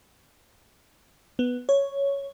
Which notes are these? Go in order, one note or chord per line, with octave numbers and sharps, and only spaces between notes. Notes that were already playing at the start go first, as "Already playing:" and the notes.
B3
C#5